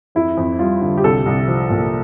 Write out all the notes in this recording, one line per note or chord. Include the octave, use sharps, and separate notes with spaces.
F2 E4
F2
G3 F4
D3
G4
C2 A4
C2
F3
A#2